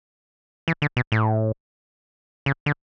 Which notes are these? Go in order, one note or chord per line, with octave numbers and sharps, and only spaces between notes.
E3
D3
B2
A2
C#3
D3